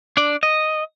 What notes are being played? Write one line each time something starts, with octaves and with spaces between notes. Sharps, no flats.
D4 D5
D#5